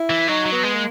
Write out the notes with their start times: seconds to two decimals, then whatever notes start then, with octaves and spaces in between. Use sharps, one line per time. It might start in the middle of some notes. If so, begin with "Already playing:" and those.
Already playing: E4
0.10 E3
0.28 F#3 D#4
0.46 F#3
0.52 B3
0.63 G#3
0.75 A#3